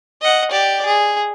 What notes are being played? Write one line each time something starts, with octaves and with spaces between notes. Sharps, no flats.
D#5 F#5
G4 D5
G#4